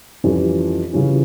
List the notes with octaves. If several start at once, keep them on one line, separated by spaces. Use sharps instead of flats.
F2 E3 G3 C#4 F4
C#3 E3 G3 C#4 F4